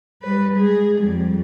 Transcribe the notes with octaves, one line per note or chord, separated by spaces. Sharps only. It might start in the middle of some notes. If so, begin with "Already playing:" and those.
G3 B4
G#3 G#4
F2 G3